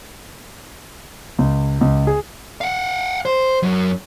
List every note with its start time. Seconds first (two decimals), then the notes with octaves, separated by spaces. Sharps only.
1.39 C#2
1.81 C#2
2.07 G#4
2.61 F5 F#5
3.25 C5
3.63 F#2